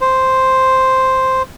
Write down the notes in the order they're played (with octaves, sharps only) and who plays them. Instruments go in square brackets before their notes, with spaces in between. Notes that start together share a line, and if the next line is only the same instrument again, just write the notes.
[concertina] C5